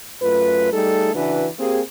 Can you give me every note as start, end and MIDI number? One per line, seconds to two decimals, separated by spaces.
0.22 0.69 42
0.22 0.69 57
0.22 0.69 65
0.22 0.69 71
0.72 1.13 55
0.72 1.13 57
0.72 1.13 63
0.72 1.13 68
0.72 1.13 69
1.15 1.47 49
1.15 1.47 52
1.15 1.47 62
1.15 1.47 66
1.15 1.47 71
1.59 1.80 58
1.59 1.80 60
1.59 1.80 67
1.59 1.80 68